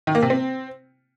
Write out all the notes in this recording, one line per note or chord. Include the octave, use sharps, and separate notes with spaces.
D#3
A#3
C3
C4